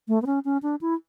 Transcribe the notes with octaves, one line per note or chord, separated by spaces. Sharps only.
A3
B3
C#4
C#4
D4
E4